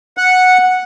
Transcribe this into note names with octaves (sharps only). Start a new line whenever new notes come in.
F#5